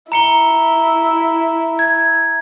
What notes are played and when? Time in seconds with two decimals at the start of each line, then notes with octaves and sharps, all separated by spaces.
0.12 E4 A#5 C#7 G7
1.79 G#6